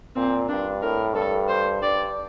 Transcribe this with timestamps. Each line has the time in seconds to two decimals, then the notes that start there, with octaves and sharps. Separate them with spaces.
0.16 A#2 C4
0.49 G2 D4
0.82 A2 A#4
1.15 G2 A4
1.48 C5
1.82 G2 D5